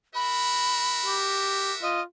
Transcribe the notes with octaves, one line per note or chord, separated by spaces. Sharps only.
F#4 A#4 E5 B5
G4
F4 D#5